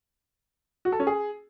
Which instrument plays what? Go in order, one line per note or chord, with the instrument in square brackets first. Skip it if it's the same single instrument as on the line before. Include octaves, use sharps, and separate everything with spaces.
[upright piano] F#4
A4
C#4
G#4